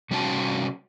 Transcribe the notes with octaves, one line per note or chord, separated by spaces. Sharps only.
C3 G3 C#4 F#4 A#4 A5